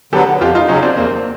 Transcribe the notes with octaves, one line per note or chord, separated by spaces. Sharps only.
D3 F#3 B3 G4 A4
F2 F4 G4
D#4 F4
C#3 F#3 C#4 D#4
C4 D4
E2 A#3 C4